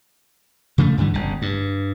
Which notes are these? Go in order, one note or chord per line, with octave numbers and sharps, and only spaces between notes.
C#3 F3 F#3 A3
G2 D3 E3 G3
G1 C#3
G2